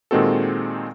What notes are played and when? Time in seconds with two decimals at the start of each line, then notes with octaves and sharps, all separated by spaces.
0.11 A#2 D#3 G#3 C4 F#4 A4